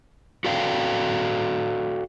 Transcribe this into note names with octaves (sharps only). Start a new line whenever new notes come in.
F#4 A4 D5 F5 G5